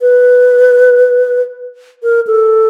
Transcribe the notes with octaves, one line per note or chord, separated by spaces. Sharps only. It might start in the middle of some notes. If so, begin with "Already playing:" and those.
B4
A#4
A4